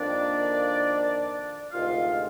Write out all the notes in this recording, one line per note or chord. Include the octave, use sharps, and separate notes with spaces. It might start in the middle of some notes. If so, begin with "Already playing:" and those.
Already playing: F2 D#3 A#3 D4 D5
D2 C3 D#3 G#3 F4 F5